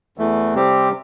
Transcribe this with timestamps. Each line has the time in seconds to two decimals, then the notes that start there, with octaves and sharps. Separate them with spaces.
0.18 E2 E3 A3
0.55 C3 G3 C4 G4